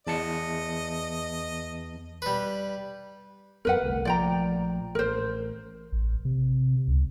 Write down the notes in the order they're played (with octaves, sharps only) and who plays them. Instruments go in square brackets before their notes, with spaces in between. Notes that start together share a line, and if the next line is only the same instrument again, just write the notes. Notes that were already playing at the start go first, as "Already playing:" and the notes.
[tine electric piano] E2 A5 C#7 [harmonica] D#5
[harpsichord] G3 B4
[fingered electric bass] F#2 B3 [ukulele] A#4 B4 F#5
[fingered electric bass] G1 C2 A3
[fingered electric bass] A#1 F3 A3 [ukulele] D5 G5 A#5
[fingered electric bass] A1 [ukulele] A#4 C5
[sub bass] A1
C3
C#2